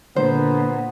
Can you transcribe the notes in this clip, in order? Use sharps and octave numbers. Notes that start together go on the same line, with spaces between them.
A#2 D3 B3 C5